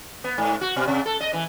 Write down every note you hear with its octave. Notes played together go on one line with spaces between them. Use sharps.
B3
G#2
F#4
B2
C3
A4
D#5
E3